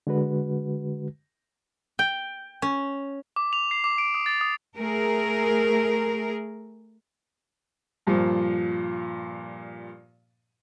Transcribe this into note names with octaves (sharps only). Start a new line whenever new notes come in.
D3 G#3 F#4 B4
G5
C#4
D6
F7
C7
D6
D7
D#6
A6
D#6
A3 G#4 A#4
G2 A#2 F3